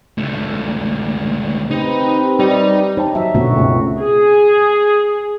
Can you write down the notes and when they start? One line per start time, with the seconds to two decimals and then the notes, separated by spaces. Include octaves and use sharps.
0.18 C#2 A3
1.71 C4 D#4 G4 B4
2.39 G3 D#4
2.97 D#4 C5 G5 A5
3.15 F#3 E5
3.34 G1 B2 A3 F#4
3.56 C#2 C4
4.00 G#4